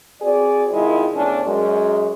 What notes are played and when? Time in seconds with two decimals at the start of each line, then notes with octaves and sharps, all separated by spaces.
0.21 C4 F#4 G#4 D5
0.72 C3 D#3 G#3 E4 F4
1.15 E2 A2 C#4 D4
1.46 F#2 G#3